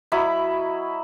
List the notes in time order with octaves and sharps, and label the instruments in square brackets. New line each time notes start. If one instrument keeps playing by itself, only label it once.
[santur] F#3 E4 D#5 B5